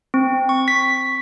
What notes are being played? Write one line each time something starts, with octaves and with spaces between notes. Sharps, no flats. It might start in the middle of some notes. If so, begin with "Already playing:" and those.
C4
C#6
B6